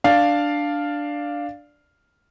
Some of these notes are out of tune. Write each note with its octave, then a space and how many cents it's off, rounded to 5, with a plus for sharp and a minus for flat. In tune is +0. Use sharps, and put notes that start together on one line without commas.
D4 +0 D5 +0 F5 +0